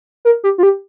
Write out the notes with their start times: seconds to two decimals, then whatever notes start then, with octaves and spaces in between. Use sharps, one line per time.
0.25 A#4
0.44 G4
0.58 F4
0.63 G4